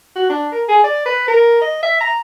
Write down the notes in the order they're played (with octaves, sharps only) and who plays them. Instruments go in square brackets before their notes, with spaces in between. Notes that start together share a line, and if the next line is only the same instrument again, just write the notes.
[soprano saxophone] F#4
D4
A#4
G#4
D5
B4
A#4
D#5
E5
A#5